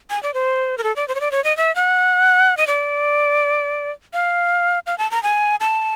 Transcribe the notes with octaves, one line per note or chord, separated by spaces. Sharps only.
G#5
D5
C5
A#4
A4
D5
C5
C#5
D5
C#5
D#5
E5
F#5
D#5
D5
F5
F5
A5
A#5
G#5
A5